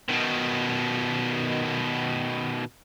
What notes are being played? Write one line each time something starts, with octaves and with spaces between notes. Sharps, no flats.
B2 D#3